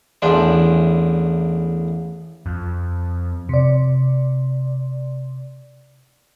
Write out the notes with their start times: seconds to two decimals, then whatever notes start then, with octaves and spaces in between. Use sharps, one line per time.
0.22 A1 E2 D4 C6
2.46 F2
3.49 C3 D5